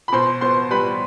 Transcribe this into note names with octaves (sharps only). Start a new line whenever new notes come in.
B5
B2 C5 C6
B3 C5 C6
G3 B4 B5